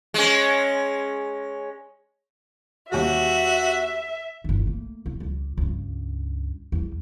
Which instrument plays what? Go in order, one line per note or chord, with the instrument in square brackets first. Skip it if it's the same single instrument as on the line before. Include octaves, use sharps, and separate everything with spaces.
[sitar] G#3 C#4
[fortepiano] D#2 G3 [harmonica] F#4 [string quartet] E5
[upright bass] G1 D#3
A3 A#3
C2
C#2 G3
C#2 G2
E2 G3